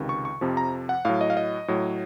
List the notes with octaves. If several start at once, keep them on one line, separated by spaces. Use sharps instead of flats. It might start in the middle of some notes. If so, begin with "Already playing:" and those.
Already playing: C#2 C3 D#3
C#6
C#6
F2 C3 F3
A#5
F#5
A2 F#3 F5
D#5
F5
D#5
A2 F#3